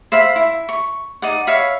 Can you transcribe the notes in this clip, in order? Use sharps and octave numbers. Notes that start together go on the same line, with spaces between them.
C5 E5 F5 B5
E4
C#6
D#4 D5 F#5
C#5 E5 F5 B5